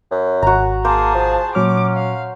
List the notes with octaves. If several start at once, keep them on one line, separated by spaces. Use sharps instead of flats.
F#2
G#1 F#4 A#5
A#3 G#4 C5 A5
F3
A#2 F#3 C#4 D6 F6
F5